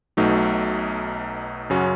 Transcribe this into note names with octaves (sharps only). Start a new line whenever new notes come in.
B1 B2 F#3 A3 D#4
F#2 C#3 F#3 C#4 F#4